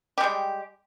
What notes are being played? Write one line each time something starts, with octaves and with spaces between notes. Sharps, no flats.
G3 G#3 G4